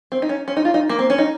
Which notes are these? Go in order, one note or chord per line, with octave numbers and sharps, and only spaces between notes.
C4
D#4
C#4
C#4
D#4
F4
D#4
A#3
C4
C#4
D#4